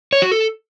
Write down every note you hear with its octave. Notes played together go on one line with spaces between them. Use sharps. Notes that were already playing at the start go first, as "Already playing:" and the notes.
C#5
F#4
A4